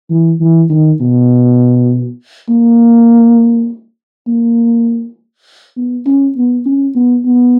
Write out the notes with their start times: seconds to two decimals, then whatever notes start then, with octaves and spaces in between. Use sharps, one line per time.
0.10 E3
0.40 E3
0.70 D#3
1.00 B2
2.49 A#3
4.27 A#3
5.77 B3
6.06 C#4
6.37 B3
6.65 C#4
6.96 B3
7.26 B3